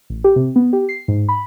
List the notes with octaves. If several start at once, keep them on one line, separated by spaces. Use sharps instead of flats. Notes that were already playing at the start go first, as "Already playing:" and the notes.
A1
G4
C3
B3
G4
C7
G#2
B5